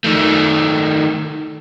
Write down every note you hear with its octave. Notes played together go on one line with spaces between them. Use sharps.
D#3 A3